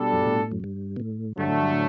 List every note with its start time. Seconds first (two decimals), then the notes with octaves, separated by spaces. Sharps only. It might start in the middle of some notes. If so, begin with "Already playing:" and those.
Already playing: B2 G3 D4 A4
0.13 F#2
0.19 G2
0.27 A2
0.52 F#2
0.64 G2
0.96 B2
1.00 A2
1.37 G2 D3 F#3 A3
1.48 A2
1.59 G2
1.73 A2